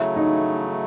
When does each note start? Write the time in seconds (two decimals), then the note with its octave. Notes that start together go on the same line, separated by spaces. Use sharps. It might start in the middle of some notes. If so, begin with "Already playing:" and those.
Already playing: C#3 F#3 A3 E4
0.16 D#4